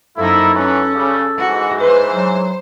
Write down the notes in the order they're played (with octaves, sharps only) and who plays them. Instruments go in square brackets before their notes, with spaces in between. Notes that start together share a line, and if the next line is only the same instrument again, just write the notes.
[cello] F#2 D#4 [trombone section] F3 A#3 E4 [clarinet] A4
[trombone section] F#2 E3 F#3 [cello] C#4
[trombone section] C#3 G3
[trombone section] G#2 E3 [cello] F#4
[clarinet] B4 [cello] C5
[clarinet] F#3